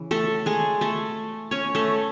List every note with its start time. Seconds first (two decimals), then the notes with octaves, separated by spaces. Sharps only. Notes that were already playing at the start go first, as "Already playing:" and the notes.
Already playing: C#3 E3
0.11 A3 A4
0.46 G#3 G#4
0.81 A3 A4
1.51 C#4 C#5
1.75 A3 A4